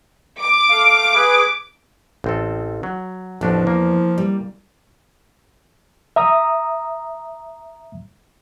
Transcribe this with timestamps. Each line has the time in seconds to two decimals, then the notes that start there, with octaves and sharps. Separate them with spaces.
0.41 D6
0.69 A3 F5
1.14 G#4 B4
2.24 A1 C4 A4
2.83 F#3
3.41 A1 E2 F3 D4 F#4
3.67 A#3
4.18 G3
6.16 E5 A#5 D#6